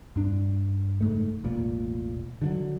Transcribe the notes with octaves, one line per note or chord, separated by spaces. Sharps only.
G2 D4
F#1 G#2 A3
E1 A1 A#2
D3 E3 F#3